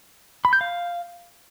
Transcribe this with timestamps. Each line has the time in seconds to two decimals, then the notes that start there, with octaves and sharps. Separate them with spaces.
0.45 B5
0.53 G6
0.61 F5